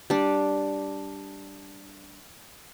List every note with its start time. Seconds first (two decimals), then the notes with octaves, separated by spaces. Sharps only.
0.10 G3 D4